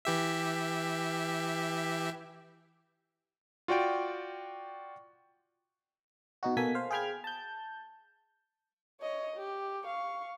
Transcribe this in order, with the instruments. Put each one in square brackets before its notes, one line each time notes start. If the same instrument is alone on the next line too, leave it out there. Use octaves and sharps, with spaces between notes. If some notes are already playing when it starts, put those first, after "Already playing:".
[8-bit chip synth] E3 G4 E5
[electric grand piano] F4 F#4 D5 G5 D7
[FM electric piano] B2 D#4 F#4
B2 A#3 A4 G#5 B6
C5 F5
G#4 F5 G5 B5 F6 G#6
A5 G6
[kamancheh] C#5 D#5
G4
F5 C#6